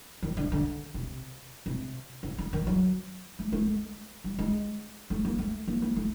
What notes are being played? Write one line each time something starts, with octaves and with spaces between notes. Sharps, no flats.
D#3
D3
D3
C3
C3
C#3
D3
D#3
F#3
A3
A3
G#3
G3
G#3
A3
A#3
A3
A#3
A#3
A3